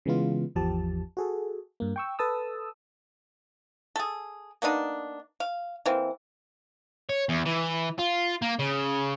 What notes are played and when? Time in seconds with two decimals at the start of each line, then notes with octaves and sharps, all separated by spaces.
0.06 C#3 E3 G#3 B3 F4
0.55 G#1 E2 F3 G4 A5
1.17 F#4 G#4 A4
1.80 G2 A#3
1.96 G5 C#6 E6
2.19 A4 B4 A5 D#6 E6
3.96 G#4 A4
4.62 A#3 B3 D4 D#4
5.40 F5
5.86 E3 A#3 C4
7.09 C#5
7.29 E2
7.46 E3
7.99 F4
8.42 A#3
8.59 C#3